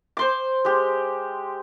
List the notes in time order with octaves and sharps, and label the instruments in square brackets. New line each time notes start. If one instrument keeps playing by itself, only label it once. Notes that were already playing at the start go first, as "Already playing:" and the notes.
[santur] C5 C6 D6
G#3 G4